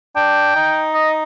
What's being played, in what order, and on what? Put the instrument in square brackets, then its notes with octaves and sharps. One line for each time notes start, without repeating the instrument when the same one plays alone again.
[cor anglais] D4 [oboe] G5
[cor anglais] D#4
[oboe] D#5